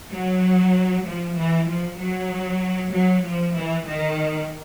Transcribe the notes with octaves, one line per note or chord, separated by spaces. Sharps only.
F#3
F3
E3
F3
F#3
F#3
F3
E3
D#3